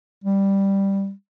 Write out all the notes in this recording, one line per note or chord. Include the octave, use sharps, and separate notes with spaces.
G3